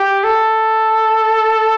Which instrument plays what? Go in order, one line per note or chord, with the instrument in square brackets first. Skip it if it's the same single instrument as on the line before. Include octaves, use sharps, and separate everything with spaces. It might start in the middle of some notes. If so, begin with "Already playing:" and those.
Already playing: [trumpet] G4
A4